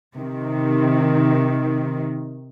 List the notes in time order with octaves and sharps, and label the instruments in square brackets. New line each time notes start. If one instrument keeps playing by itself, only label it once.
[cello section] C3 D#3